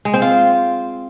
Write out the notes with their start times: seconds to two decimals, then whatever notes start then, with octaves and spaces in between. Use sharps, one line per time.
0.05 G#3
0.14 C4
0.22 F4